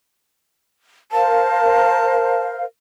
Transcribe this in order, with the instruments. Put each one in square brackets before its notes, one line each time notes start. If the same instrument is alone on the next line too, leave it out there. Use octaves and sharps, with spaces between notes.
[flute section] A#4 C5 F5 [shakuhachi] A5